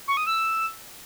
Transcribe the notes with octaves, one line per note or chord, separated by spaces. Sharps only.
C#6
D#6
E6